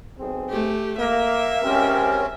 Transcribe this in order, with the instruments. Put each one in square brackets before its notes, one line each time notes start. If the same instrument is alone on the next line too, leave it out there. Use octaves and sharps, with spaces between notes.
[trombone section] B1 C4 G#4
[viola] A3 G4
[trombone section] A#3 [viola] E5
[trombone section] C#2 G4 A#4 [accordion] C4 C#4